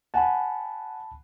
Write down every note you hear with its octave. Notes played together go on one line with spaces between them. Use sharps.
F#5 G#5 A5 B5